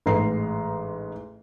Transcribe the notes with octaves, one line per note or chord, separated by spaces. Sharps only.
A1 G#2 B4 D#5 A#5 C7